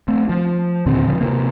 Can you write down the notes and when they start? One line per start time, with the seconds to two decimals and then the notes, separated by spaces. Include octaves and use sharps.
0.08 A3 C4
0.29 F3
0.86 D#2 A#2 D3 C4
1.07 C#3 F3
1.20 C3 A#3